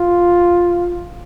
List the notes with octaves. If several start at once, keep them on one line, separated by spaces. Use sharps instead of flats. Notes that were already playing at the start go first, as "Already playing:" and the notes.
Already playing: F4